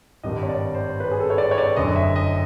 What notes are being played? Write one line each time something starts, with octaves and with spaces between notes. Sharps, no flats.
G#1 G2 D#3 D#5
C#5
D5
C5
B4
G#4
A4
C#5
D5
C#5
D5
F#1 F#2 D3 D#5
E5
D#5